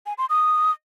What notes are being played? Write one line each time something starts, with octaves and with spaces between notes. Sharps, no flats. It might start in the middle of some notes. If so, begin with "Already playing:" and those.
G#5
C6
D#6